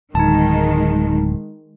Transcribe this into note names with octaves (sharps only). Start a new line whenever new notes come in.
D1 D#3 G#3 D#4 A5